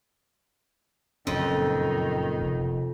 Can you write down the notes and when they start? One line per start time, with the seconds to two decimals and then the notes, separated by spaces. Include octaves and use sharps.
1.27 F#1 F2 A#2 D#3 C#4
2.41 F1